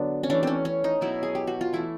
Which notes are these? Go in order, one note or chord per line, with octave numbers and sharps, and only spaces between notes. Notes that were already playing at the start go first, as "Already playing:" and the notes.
Already playing: D3 F#3 B3 D4
C#4
E3 A3 D4
C4 C#4
C#4
D#4
B2 F#3 B3 E4
G#4
G4
F#4
F4
E3 A3 E4